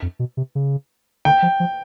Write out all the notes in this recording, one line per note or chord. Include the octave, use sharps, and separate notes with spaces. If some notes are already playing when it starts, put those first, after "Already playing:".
F2
B2
C3
C#3
D3 G5
F3
F3